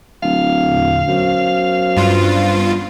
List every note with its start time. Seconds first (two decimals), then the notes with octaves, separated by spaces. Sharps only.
0.23 D1 F5
0.63 E2 A#2 D3
1.08 F#2 B3 C#4 C5
1.97 G2 F4